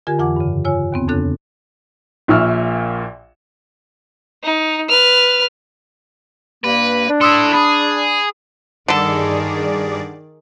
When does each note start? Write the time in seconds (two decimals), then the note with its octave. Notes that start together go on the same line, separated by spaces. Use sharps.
0.07 D3 F4 G4 A#4 G#5 G#6
0.19 F2 E3 F4 F#5 D6
0.36 G2 C#3
0.65 F4 C#5 G#5 E6
0.92 D#2 B3 C4
1.08 F2 C#3 D4 A4 F#6
2.28 A#1 A#2 E5 C#6 E6 F6
4.43 D#4
4.89 B4 F6
6.64 G2 A#3 B4
7.09 D4
7.21 E4 A4 C6 D#6 E6
7.53 G#4 B5 D#6
8.88 G2 D3 D#3 G#4 A4 D5